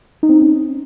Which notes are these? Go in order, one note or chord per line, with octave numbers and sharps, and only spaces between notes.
D#4
C4
D#4
C#4